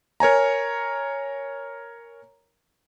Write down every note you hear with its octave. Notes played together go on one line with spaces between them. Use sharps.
A#4 C#5 G#5 A#5